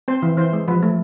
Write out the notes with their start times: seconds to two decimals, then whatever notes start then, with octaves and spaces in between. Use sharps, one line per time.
0.08 C4 C5
0.22 E3
0.37 E3 C5
0.53 G#3
0.68 F3 B4
0.83 A3